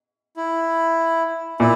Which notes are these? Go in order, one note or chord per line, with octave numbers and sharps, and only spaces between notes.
E4
A#2 E4